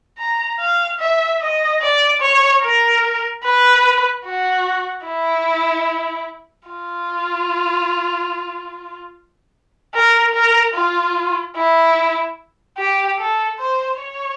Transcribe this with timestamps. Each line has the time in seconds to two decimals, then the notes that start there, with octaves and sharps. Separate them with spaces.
0.18 A#5
0.59 F5
0.99 E5
1.41 D#5
1.81 D5
2.21 C#5
2.62 A#4
3.44 B4
4.25 F#4
5.06 E4
6.68 F4
9.94 A#4
10.34 A#4
10.74 F4
11.56 E4
12.78 G4
13.19 A4
13.59 C5
13.99 C#5